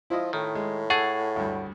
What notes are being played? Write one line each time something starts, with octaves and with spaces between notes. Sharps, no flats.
F3 E4 F4 D#5
A2 D#3
G#3
G#4 A4 F#5 C#6 A6
D2 G2